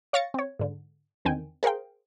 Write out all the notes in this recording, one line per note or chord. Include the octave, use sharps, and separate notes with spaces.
C#5 F5 C#6 A6 A#6 C#7
C4 C#5
G#2 D3
E2 D3 D#3 C4 G5 G#5
G#4 A#4 C5 F5 G5